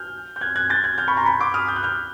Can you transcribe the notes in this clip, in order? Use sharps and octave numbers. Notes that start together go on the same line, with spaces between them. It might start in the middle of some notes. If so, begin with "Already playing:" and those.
Already playing: F6 G6
G6
F#6 G#6
F#6 G#6
G6 A6
F#6 G#6
F6 G6
B5 C#6
A#5 C6
B5 C#6
C6 D6
D#6 F6
G6
F#6
F6 G6